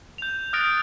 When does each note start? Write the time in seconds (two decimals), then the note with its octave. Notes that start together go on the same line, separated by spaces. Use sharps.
0.18 G6 F7
0.53 D#6 F6 F#6 A6 A#6 D7